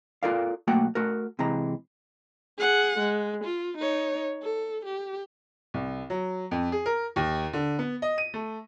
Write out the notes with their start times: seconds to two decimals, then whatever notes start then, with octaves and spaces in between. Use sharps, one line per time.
0.23 F4 F#4 A4 A#4 D5 F5
0.67 B1 A3 A#3 F#4 F#5 G5
0.95 A3 F#4 A#4
1.39 C3 E3 G#3 A#5
2.58 G#4 F#5
2.99 G#3
3.44 F4
3.78 D#4 C#5
4.42 A4
4.85 G4
5.74 C2
6.10 F#3
6.51 F2
6.72 G#4
6.86 A#4
7.16 D#2
7.53 D3
7.79 B3
8.02 D#5
8.18 D#7
8.34 A3